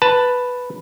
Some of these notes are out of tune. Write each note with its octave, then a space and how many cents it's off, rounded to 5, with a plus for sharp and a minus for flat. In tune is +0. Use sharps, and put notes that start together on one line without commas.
B4 +0 A5 +5